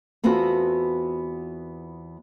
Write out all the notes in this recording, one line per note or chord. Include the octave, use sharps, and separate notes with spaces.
E2 B3 C4 F4 F#4 A4